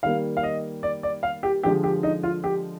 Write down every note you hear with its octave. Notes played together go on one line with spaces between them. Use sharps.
D#3 G3 A#3 F5
F5
D#5
D5
D5
F5
G4
D3 F3 G#3 G4
G4
D#4
F4
G4